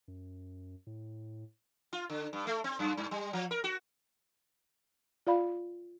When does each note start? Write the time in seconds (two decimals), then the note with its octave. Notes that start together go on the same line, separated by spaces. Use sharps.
0.08 F#2
0.87 A2
1.93 F4
2.10 D3
2.33 G2
2.47 A3
2.64 C4
2.79 F#2
2.97 G2
3.11 G3
3.33 F3
3.51 A#4
3.64 F#4
5.27 F4 D5 F5 B5